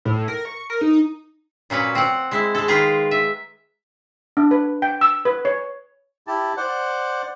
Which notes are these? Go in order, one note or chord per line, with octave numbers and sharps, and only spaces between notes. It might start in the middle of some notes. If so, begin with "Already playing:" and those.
A2
A#4
C#6
A#4
D#4
A#2 F#3 C#4 B4
C4 F#5
G#3 E4
G#3 A4
D#3 F4 G#4 B4 A#5
E5
D4
B4
G5
E6
B4
C#5
E4 G4 A5
C5 D5 F#5